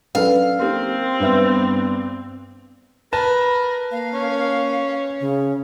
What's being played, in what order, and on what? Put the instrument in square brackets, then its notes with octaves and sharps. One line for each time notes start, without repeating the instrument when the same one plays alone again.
[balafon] F#3 C#4 B4 [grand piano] D4 A4 [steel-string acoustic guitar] F5
[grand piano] A#3 [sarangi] C4 [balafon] D#4 G4 C6
[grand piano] G2 B3 E6 [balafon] B4 E5
[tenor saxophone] A#4 [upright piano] B4 A5 [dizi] B5
[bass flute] A#3 [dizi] F5
[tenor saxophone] C#4
[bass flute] C#3